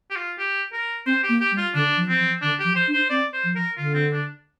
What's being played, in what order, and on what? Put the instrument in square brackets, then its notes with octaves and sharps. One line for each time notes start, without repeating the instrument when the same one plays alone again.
[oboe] G4
F4
G4
A#4
[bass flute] C4 [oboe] C5
[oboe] G4
[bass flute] A#3
[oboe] G4
[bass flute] G3
[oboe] F4
[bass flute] D3 [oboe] D4
[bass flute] F3
[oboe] C4
[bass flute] F3
[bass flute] D3 [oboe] D4
[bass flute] F3 [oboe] G4
[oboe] C5
[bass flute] D4
[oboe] C5
[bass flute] C4 [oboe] D5
[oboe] C5
[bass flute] F3
[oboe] A#4
[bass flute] D3 [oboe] F4
[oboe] C4
D4